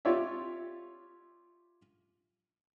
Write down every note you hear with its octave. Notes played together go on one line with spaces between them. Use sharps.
F4 G4 C#5 D5 E5